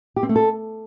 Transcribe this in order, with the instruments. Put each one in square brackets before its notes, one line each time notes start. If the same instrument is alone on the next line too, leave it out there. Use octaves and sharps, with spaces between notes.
[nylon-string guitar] G4
C4
A3
A4